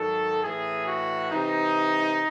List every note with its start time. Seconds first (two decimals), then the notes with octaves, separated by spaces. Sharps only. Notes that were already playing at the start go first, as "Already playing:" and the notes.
Already playing: G#2 D#3 F#3 A4
0.43 A2 E3 G#4
0.87 F#4
1.32 C3 E3 D#4